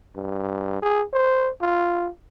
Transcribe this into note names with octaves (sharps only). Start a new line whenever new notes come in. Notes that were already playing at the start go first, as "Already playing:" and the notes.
G2
G#4
C5
F4